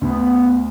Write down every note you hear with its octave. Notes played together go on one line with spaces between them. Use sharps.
D2 B3